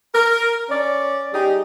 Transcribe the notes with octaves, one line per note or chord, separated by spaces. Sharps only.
A#4
C#4 D5
G3 D#4 G4 G#4